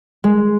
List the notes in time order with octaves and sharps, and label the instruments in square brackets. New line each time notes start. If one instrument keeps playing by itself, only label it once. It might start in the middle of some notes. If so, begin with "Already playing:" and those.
[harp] G#3